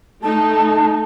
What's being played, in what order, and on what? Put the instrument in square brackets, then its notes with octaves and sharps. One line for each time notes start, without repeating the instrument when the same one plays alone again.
[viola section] A3 D#4 [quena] A5